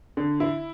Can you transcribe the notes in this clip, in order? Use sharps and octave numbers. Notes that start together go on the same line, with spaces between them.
D3
E4